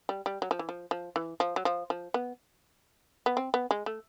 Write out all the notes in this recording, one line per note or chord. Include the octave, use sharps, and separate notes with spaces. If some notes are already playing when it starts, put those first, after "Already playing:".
G3
G3
F#3
F3
E3
F3
F3
E3
F3
F#3
F3
F3
B3
B3
C4
B3
G#3
A3